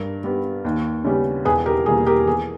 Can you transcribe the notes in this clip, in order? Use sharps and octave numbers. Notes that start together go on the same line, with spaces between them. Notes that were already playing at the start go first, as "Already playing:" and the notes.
Already playing: G2 A#4
G3 B3
D#2
C#3 G3 B3
E1 G#4 B4
G4 A#4
E2 B2 G3 A#3 G#4
G4 A#4
E2 G#4